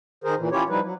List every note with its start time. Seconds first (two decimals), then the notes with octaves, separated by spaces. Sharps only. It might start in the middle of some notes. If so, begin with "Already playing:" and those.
0.24 D#3 G#4 A#4 C5
0.38 A#2 E3
0.52 C#4 E4 F4 G4 C#5
0.69 F3 G3 D#4 E4 B4
0.83 F#3